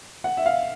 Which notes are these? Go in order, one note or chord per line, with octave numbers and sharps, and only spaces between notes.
F#5
E5
F5